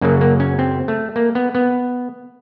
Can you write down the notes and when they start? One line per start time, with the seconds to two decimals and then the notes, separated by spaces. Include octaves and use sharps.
0.01 F#2 C#3 F#3 A#3
0.21 A#3
0.40 C#4
0.59 C4
0.88 A3
1.16 A#3
1.35 B3
1.55 B3